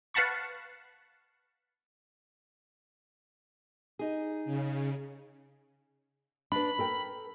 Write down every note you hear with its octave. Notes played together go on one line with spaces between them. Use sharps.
B4 F5 F#5 A5 B5 C#6
D#4 G#4
C#3
D4 B4 B5
A4 A#4 G5